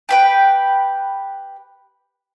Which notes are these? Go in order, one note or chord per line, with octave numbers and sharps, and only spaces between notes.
G4 B4 G5